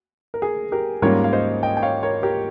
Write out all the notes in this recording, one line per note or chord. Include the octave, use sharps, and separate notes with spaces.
A#4
G#4
G4 A#4
G#2 G3 A#3 C#4 F4 A#4 C#5
F5
C5 D#5
D#5 G5
G5
C#5 F5
A#4 C#5
G4 A#4